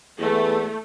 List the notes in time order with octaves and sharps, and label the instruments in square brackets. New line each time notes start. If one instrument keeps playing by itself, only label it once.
[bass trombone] E2 [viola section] A3